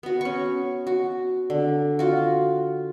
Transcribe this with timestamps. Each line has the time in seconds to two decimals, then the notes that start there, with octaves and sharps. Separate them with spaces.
0.03 B3 F#4
0.21 C#4 C#6
0.87 F#4
1.50 D3
1.99 F4 F#4